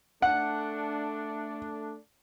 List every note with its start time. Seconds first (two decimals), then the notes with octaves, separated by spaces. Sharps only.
0.22 A3 D4 F#5